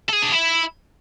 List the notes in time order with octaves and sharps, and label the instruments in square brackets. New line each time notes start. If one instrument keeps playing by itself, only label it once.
[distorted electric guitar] A4
G#4
D4
E4